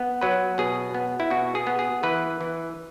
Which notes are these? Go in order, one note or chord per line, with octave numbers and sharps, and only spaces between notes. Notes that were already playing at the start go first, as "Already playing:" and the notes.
Already playing: B3
F#3 B4
B2 G#4
B3
E4
B2 F#4
G#4
B3
G#4
E3 B4
E3